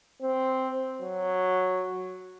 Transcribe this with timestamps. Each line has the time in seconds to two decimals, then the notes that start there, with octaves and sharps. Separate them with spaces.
0.22 C4
1.02 F#3